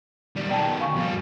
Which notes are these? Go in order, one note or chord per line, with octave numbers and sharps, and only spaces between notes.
D#2 G3
B2 D#3 D5 G5 A5
F5 G#5 C#6
F2 G3 F#4